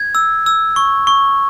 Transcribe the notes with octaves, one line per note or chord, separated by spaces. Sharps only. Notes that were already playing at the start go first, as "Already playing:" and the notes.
Already playing: G#6
E6
E6
C#6
C#6